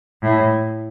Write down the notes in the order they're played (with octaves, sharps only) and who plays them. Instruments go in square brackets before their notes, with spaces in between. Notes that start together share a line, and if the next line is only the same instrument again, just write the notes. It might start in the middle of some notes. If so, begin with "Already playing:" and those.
[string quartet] A2